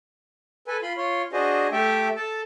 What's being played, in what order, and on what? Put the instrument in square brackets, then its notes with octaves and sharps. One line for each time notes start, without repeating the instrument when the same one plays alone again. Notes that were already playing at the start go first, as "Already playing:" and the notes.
[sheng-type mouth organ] A4 B4 G#5
F4 B5 C6
F4 C#5 C6
D4 F#4 G#4 C5 D#5
A3 G4 A4 E5 G5
A4 A5